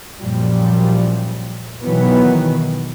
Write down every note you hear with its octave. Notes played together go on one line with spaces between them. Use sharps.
F#2 A#2 F3 G3
B2 D#3 E3 F#3 B3